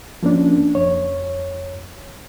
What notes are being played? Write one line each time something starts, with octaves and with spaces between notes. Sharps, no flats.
F3 A#3 C#4 D4
F2 C#5